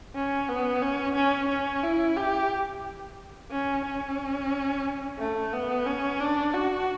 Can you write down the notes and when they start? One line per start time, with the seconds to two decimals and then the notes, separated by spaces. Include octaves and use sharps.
0.15 C#4
0.49 B3
0.82 C#4
1.15 C#4
1.49 C#4
1.83 E4
2.17 G4
3.51 C#4
3.85 C#4
5.19 A3
5.53 B3
5.86 C#4
6.20 D4
6.54 F#4